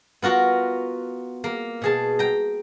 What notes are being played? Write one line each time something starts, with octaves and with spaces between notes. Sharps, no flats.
B3 F4 F#4 A#4
A#3
B2 G#4 A5
G5 A#5